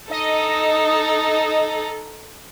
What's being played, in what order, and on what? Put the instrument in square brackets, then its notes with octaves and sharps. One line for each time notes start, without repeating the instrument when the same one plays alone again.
[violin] D#4 A4 [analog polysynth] D#5